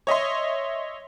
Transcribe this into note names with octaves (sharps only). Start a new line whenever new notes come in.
C#5 D#5 E5 C6